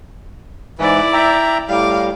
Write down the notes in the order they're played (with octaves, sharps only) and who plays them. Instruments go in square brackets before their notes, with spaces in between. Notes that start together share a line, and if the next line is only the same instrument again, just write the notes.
[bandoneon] G#2 E3 [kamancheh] E4 D5
[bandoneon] E5 G5 A#5
[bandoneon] A2 G3 [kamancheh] F5 D6